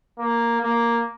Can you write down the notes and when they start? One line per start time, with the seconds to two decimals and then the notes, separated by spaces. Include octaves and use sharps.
0.19 A#3
0.61 A#3